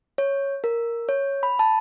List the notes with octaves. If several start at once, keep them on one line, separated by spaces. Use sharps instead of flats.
C#5
A#4
C#5
B5
A5